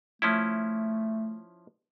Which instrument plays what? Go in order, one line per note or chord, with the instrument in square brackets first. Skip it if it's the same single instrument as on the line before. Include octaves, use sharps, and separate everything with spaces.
[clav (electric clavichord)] F3 C#4 E4 [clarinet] A3